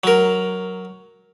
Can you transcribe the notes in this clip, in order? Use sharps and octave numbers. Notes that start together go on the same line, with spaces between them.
F#3 A#4